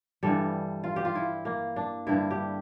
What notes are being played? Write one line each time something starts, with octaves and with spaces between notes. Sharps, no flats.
G2 E3 G3 A4
F4
G4
F4
E4
A#3
D4
G2 D3 G3 E4
G4